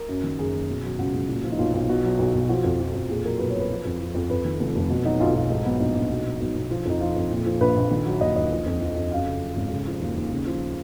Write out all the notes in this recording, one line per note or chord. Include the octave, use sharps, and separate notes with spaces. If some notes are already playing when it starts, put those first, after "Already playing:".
Already playing: A#4
F#2
D#3
F#1 G#4
F#1
B2
F#3
C#2 F#4
C#2
A#2
F3
D#4
B1 F4
B1
B2
F#3
B1
B1
F3 F#4
F2
F3
F2
A#2 G#4
F#3 A#4
B1 B4
C#5
B1
B4
F3
F2
F3
F2
F2 B4
D#3
F1
F1
B2
F#3 D#4
B1 F4
B1 F4
G#2 D#4
F#3 B3
A#1 D#4
A#1
B2
F#3
B1 D#4
B1
F3
F2 D#4
F3 F4
F2
A#2
F3
A#1 B4
A#1
D#3
F#3
D#2 D#5
D#2 D#5
F3
F2
F3
F2
F#2 F5
C#3
F#3
G#1
C#3
F3
D#2
D#2
C#3
F3